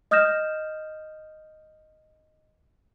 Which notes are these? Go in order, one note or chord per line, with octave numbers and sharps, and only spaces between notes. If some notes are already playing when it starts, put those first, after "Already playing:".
D#5 D#6 F6 G6 A#6 E7